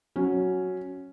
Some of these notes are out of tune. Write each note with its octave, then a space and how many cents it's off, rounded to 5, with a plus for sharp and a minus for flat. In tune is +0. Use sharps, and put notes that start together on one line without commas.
F#3 +0 C#4 +0